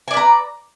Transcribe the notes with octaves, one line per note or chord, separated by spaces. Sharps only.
B4 D5 G#5 A#5